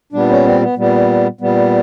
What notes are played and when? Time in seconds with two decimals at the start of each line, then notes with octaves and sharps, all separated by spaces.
0.13 A#2 G3 B3 D4
0.29 C#4
0.45 C4
0.61 B3
0.76 A#2 G3 B3
1.41 A#2 G3 B3